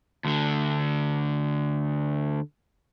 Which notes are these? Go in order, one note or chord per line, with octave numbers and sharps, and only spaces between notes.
D2 D3